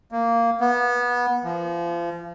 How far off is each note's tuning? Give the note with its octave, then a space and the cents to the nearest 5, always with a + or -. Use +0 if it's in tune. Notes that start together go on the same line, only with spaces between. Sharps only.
A#3 -10
B3 -20
F3 -30